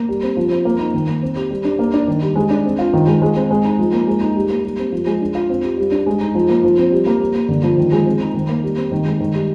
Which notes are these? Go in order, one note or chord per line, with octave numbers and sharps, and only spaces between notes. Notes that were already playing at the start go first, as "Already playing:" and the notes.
Already playing: A#3
G3
C4
F3
C4
A#3
D#4
D#3
A#3
C4
G4
G3
D4
A#3
D4
D#3
G3
G#3
D4
C4
F4
D#3
G#3
G#3
C4
G#3
D#4
F3
A#3
G#3
D#4
G3
A#3
G3
C4
F3
G#3
D4
F4
C4
G4
G3
D4
G#3
D#4
F3
A#3
F3
C4
G3
A#3
G3
A#3
D3
F3
D#3
G#3
C4
D#4
D#3
A#3
G3
C4
D#3
G#3
D#3
G3